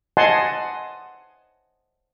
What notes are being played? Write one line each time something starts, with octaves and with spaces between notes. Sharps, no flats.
D#5 F#5 G#5 A5 C6